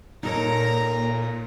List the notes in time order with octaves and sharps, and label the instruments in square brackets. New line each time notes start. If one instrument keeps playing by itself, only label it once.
[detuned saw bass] A#2 [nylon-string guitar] D#4 A4 C#5 [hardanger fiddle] A#4 A#5